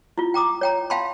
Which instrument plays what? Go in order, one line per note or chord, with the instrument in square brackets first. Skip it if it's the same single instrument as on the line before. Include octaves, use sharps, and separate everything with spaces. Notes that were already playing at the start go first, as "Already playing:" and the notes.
[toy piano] E4 F4
G5 A#5 D6 D#6
C#5 G5 A#5
E5 F5 G5 A5 B5 C6